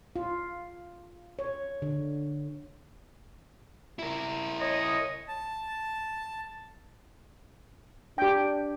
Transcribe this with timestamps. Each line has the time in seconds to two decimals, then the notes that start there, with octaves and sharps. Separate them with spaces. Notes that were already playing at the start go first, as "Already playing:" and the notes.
0.16 F4
1.39 C#5
1.82 D3
3.99 E4 A#4
4.60 C#5 D#5
5.28 A5
8.18 D4 G4 G5